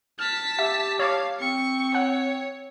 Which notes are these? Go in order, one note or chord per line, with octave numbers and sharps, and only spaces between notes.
A5 F6 B6
G4 E5
C#5 F5 A5 D6
C4 C#6
C#5 F#5